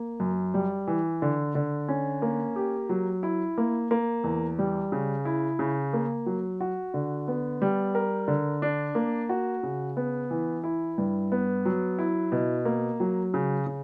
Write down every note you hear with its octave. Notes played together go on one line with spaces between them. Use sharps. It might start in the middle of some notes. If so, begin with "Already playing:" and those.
Already playing: A#3
F#2
G3
E3
D3
D3
C#4
A#3
G4
F#3
E4
A#3
A#3
E2
G3
C#3
E4
C#3
A#3
F#3
F#4
D3
B3
G3
A#4
D3
D4
A#3
F#4
C#3
B3
E3
E4
G2
B3
F#3
E4
B2
A#3
F#3
C#3
C#3